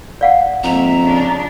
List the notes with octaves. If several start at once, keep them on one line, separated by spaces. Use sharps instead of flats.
D5 F5 F#5
F2 G#2 A#3 E5 A#5
C#3 D4